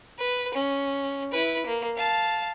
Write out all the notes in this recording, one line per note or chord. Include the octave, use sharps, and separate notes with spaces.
B4
C#4
E4 B4
A#3
F5 A5